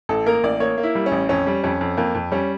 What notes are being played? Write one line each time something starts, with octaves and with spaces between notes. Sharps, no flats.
A1 A4
A#3 A#4
A1 D5
A#3 C#5
A#3
E4
G3
C#4
A1
F2 C#4
G3
F2 C#4
F2
F2 A#3
F2
G3 C#4